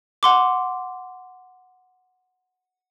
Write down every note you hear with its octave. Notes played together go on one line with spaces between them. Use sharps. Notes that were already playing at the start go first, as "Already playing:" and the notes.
F#5 C6 D6